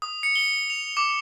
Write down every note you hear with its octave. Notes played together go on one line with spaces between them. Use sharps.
D#6
C#7
G7
F7
D6